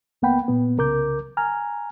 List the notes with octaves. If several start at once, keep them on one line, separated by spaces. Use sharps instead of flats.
C#2 A#3 B3 F#5 G5 B5
A#2 B3
C2 C#3 A#4 D6 G6
G#5 A#5 F6